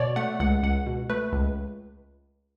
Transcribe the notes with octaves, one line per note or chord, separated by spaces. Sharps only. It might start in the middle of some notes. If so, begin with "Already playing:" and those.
Already playing: B2 C#5 D5
A3 F#5
C#2 F#5
C#2 F#5
B2
A3 B4
C#2